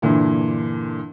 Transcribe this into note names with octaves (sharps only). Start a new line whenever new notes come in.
G2 A#2 D3 E3